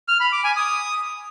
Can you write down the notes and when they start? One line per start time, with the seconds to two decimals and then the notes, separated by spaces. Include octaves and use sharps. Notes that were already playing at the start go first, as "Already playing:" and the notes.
0.08 F6
0.20 B5
0.32 D6
0.44 G#5
0.56 D#6